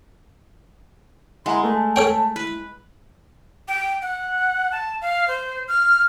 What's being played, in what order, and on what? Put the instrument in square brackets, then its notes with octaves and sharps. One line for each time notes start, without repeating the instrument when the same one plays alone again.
[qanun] G#3 [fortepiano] E4 F#5 A#5 [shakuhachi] C6
[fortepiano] A3 [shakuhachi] A5
[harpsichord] A4 C#5 G5 [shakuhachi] A5
[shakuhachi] E4 [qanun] B4
[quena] G5
F#5
A5
F5
C5
F6